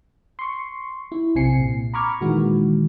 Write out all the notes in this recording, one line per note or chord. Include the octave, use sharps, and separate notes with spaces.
C6 C#6
E4
B1 C3 C4 G#5 C7 C#7
A#2
A#5 B5 C#6 D6 F6 G#6
A#2 D#3 E3 G#3 F#4